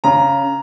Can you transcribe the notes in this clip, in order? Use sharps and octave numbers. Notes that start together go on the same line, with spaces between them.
C#3 A#5